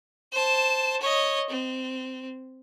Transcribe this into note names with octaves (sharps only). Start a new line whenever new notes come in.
C5 A5
C#5 D#5
C4